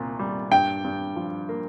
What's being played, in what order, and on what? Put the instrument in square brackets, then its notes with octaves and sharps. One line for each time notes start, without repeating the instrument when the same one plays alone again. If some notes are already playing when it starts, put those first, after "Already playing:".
Already playing: [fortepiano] C2 A#2
G3
[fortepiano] G2 [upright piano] G5
[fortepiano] G2
F3
A#3